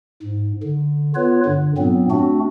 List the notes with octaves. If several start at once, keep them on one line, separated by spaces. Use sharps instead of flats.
G#2
D3
B3 F4 B4 C#5
G2 D3
G2 A#2 F#3 B3 C4
A3 C4 D4 F#4